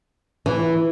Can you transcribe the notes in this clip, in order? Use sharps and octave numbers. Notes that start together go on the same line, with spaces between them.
E3